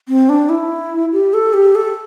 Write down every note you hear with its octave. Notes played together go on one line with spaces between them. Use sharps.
C4
D4
E4
G4
A4
G4
A4